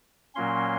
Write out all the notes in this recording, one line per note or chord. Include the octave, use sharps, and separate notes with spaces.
A#2 F#3 A#3 C#4 C6